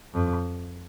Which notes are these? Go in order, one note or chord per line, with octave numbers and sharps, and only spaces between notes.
F2